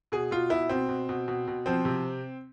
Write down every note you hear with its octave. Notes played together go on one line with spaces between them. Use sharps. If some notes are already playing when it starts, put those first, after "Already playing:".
B2 G#4
B2 F4
B2 E4
B2 C4
B2
B2
B2
B2
F3 C4
C3